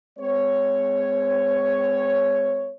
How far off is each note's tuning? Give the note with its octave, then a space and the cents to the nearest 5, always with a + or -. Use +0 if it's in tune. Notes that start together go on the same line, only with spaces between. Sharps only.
G#3 +0 C4 -35 C#5 +0